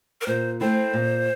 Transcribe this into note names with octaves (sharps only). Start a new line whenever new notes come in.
A#4
A#2 C5
A3 C4 E4 C5
A#2